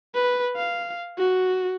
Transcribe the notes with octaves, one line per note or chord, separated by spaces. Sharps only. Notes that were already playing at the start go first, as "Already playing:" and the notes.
B4
F5
F#4